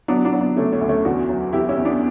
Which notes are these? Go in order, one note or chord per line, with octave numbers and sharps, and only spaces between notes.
F#3 B3 D4
B3 D4
F#3
B3 D4
C#3 A3 C#4
A3 C#4
D2
A3 C#4
E2 D4 F#4
F#3
E2 E4 G4
C#4 E4
E2
B3 D4